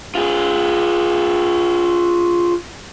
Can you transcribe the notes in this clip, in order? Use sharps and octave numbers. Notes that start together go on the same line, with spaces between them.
F4 G#4